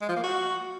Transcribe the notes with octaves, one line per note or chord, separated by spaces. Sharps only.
G#3
F3
A#3
F#4